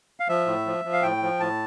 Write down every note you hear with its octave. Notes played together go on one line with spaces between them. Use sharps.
F5
F3 E5
A2
F3
F3
F5
A2 G5
F3
A2 A5